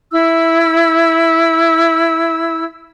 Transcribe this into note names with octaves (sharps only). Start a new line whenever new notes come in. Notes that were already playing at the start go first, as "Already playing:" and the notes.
E4 E6